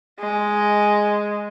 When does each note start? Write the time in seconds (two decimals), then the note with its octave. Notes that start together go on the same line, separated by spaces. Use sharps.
0.20 G#3